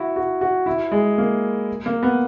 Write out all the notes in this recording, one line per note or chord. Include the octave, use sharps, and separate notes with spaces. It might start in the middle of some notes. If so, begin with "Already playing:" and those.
Already playing: E4 F#4
F#4
F#4
E4
G#3
A#3
A#3
B3